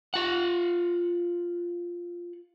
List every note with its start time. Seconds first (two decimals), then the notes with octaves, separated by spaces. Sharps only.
0.14 F4 F#5